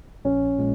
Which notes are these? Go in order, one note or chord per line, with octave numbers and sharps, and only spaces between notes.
A#1 C#4
A#2 G#3